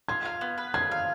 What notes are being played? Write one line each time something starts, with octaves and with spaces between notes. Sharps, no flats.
F4 G#6
F5
B3
B4
F4 G#6
F5